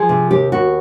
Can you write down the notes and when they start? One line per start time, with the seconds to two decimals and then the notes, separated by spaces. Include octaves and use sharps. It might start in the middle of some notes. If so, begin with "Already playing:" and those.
Already playing: F3 G#4
0.09 C3
0.31 D#2 G4
0.52 D#2 F#4